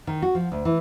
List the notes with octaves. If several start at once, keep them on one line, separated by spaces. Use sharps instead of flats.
D#3
F#4
F3
D2
E3